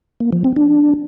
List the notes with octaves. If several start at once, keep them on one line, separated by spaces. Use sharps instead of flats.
A#3
F3
C4
D4